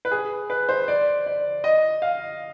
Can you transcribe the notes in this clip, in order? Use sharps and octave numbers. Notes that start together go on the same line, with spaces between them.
B4
G#4
B4
C5
D5
D5
D#5
F5